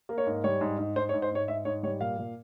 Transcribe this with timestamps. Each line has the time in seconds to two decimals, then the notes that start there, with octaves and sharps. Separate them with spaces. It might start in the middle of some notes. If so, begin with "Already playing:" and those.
0.09 A#3
0.18 C#5
0.26 G#2
0.44 G3 C#5
0.61 G#2
0.78 G#2
0.96 G#2 C5
1.09 C#5
1.13 G#2
1.22 C5
1.31 G#2 C#5
1.48 G#2 E5
1.65 G#2 C#5
1.83 G3 C#5
2.00 A#2 F5
2.18 A#2